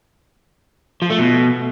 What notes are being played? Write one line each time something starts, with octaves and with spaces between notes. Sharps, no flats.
F3
A3
B2